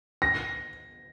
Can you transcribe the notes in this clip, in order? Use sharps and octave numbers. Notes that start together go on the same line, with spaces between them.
A#6